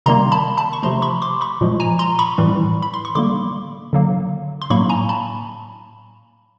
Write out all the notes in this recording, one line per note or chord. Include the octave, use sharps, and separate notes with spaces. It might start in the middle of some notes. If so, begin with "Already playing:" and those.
C3 D#3 G3 A#3 A#5 C6
A5 B5
A5 B5
C#6
C3 F3 A3 A#5 C6
B5 C#6
C6 D6
B5 C#6
A#2 F3 G#3
G#5 A#5
A#5 C6
B5 C#6
A2 E3 G3
B5
C6
C#6
D3 G3 A#3 C6 D6
D3 F#3 A#3
C6
A2 F#3 A#3 B5 C#6
G#5 A#5
A5 B5